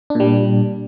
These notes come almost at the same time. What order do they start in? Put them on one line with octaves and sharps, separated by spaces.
D4 A#2 G3